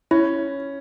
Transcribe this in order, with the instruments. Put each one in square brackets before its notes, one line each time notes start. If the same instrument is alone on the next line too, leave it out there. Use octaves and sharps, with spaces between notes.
[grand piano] C#4 [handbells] E4